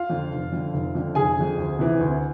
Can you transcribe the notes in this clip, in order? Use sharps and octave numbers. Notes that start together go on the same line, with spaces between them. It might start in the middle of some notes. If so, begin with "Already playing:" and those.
Already playing: F4 F5
F2 D3
F1
F2 D3
F1
F2 D3
F1 G#4 G#5
F2 D3
D2
C3 E3
D2